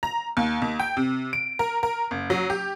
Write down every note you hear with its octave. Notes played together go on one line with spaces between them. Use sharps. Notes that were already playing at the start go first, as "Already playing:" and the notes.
A#5
D#2
D#2
G5
C3
D7
A#4
A#4
F#1
F#3
G4